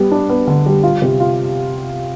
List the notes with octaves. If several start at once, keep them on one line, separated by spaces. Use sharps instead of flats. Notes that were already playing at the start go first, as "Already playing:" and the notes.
Already playing: G3 B3
D4
B3
D3
G3
F4
C3
F4